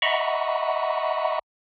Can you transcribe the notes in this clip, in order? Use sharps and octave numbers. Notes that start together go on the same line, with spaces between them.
D#5 E5 F#5 A#5 B5 C#6